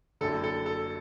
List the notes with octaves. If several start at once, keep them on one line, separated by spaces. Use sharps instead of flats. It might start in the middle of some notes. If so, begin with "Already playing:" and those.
F#1 F#2 D3 A4
A4
A4